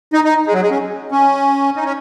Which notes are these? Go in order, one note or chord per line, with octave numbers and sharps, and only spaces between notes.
D#4
D#4
G#3
F#3
G#3
C#4
C#4
D#4
C#4